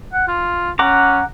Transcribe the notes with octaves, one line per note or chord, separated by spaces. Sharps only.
F#5
F4
C#4 F#5 A#5 D6